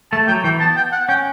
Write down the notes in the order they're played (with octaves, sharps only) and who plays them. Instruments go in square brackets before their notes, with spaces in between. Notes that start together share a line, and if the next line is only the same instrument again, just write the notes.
[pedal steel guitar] A3 [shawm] A5
[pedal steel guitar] F#3 [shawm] G5
[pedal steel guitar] E3 [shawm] G5
[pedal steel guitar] B3 [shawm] A5
[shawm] G5
F#5
[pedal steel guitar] C#4 [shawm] G5